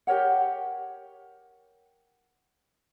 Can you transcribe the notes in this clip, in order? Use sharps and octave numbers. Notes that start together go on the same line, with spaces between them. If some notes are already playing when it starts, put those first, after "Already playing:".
G4 A#4 C#5 F#5